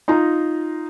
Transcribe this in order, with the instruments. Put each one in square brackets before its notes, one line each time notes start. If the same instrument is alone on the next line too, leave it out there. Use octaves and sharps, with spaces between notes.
[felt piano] D#4 F4 A#5